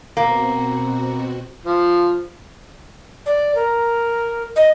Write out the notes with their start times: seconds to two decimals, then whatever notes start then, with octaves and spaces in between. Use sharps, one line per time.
0.17 B2 A#3 C4 F#4
1.65 F3
3.26 D5
3.55 A#4
4.56 D#5